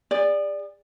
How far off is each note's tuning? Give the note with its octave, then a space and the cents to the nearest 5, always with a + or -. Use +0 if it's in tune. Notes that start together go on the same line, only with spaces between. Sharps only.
G#4 -40 D5 +0